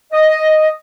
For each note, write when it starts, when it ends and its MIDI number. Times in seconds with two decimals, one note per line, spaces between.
0.12 0.69 75